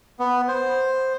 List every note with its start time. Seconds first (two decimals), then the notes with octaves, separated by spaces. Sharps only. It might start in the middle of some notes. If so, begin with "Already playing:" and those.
0.19 B3
0.48 C5